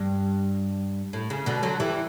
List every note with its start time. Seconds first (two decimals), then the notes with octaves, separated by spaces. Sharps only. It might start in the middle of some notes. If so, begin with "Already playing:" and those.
Already playing: G2
1.13 A2
1.30 C#3
1.46 B2 D3
1.63 D3 F#3
1.80 E3 G3